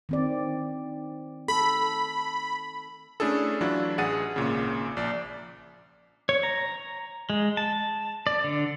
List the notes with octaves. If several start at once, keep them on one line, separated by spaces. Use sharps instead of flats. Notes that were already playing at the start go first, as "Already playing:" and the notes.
D#3 C4 D5
A4 B5
A3 C#4 D4 E4 G#4 A4
E3 F#3 D4 E4 F4
A1 G#4 F#5 A6 D#7
G#1 A#2 C#3
A#1 D5
C#5
A#5
G#3
A5
D5
D3